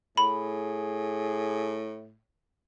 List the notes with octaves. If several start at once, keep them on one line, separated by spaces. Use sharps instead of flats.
A2 G#4 B5